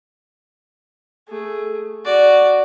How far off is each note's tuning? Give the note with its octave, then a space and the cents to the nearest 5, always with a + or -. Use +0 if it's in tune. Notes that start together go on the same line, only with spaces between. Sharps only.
A3 +0 G#4 +0
F#4 +0 D5 +0